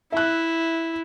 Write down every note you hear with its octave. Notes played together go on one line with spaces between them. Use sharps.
E4 E5 F#6